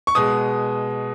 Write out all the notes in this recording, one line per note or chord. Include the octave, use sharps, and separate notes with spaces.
C#6
B2 G#3 D#6